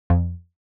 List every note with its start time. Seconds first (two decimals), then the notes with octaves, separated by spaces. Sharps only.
0.10 F2